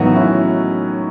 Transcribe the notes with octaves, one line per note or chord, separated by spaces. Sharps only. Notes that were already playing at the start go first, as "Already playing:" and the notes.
Already playing: A2 D#3 E3 F#3 B3 F#4
C#4 E4